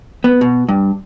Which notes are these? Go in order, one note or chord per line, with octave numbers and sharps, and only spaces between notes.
B3
B2
G2